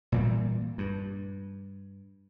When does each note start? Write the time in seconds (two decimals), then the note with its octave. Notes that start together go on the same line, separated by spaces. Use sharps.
0.12 A#2 E3 G3
0.78 G2